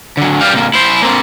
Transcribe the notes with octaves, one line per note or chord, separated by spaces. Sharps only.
D3 F#3
G3 F5
C3 A#3
E4 C5
A#3 C4